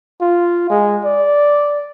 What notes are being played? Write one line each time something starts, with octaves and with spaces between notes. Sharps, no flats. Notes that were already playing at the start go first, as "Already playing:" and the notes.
F4
G#3
D5